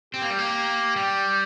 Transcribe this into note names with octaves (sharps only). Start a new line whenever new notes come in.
C4 G4
A#3
G3
A#3
G3